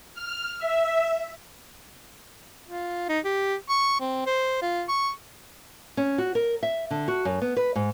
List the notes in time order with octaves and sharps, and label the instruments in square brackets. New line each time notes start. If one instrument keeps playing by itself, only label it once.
[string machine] F6
E5
[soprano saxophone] F4
D#4
G4
C#6
C4
C5
F4
C#6
[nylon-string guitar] C#4
F#4
A#4
E5
D3
F#4
F#2
B3
B4
G#2